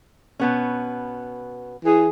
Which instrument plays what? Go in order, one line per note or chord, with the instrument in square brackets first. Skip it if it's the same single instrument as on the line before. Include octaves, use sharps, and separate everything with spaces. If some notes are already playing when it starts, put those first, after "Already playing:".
[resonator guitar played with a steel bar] B2 B3 C#4
[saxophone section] E3 G#4